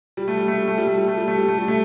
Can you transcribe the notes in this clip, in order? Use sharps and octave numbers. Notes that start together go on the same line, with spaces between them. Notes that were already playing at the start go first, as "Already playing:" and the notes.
G3
A3
G3
A3
G3
A3
G3
A3
G3
A3
G3
A3
G3
A3
G3
A3